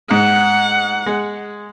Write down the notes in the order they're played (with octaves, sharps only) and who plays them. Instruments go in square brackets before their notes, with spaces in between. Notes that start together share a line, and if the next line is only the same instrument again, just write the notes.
[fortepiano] G#2 [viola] F#5
[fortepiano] G#3